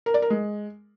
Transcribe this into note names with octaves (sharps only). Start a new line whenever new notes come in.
A#4
D5
A#4
G#3